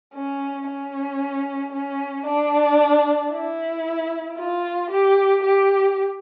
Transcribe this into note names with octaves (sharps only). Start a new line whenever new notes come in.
C#4
C#4
C#4
D4
E4
F4
G4
G4